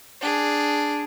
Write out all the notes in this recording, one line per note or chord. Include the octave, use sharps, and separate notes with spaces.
D4 G#4